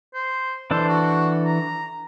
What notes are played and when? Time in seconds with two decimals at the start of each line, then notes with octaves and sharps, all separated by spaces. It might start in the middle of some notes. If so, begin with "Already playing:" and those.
0.14 C5
0.71 E3 D4 A4 C5
0.89 F#4
1.46 A#5